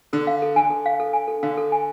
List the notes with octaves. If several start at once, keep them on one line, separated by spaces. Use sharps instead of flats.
D3 A4
F5
A4
D3 G#5
A4
F5
A4
G#5
A4
D3 F5
A4
G#5